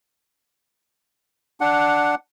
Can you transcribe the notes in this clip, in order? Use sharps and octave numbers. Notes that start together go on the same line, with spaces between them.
D4 F#5